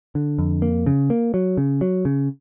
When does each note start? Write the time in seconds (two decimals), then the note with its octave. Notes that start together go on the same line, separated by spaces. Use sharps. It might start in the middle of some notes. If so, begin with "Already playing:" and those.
0.15 D3
0.39 F2
0.62 A#3
0.86 C#3
1.10 A#3
1.34 F#3
1.57 C#3
1.81 F#3
2.05 C#3